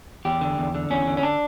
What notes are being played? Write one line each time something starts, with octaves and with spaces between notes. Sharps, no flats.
E2 G4
D3
E2
D3
E2 C#4
D3
C#4
D4